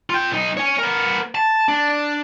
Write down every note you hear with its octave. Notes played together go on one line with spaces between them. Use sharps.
F4 G5
B1 D#4
C#5 G#5
B3 A#4
A5
D4